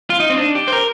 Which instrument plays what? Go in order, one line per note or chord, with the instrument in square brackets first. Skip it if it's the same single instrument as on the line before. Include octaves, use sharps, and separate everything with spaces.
[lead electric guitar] F4
D#4
C4
D4
G4
C5
A#4